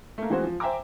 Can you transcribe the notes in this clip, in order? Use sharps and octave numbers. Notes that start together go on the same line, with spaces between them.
A3 A#3
E3 G#3 C4 F#4 C5
F3
C5 E5 G5 G#5 A#5 D6